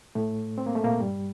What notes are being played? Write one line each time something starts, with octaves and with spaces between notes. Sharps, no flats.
A2 A3
C4
A#3
A3
A#2 A#3
G2 G3